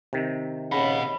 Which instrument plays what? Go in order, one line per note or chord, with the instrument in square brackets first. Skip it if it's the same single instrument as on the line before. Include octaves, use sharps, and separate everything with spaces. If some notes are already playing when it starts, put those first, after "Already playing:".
[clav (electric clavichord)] C3 D#3
[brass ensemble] C#3 [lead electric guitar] D#5 F#5 [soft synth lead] B5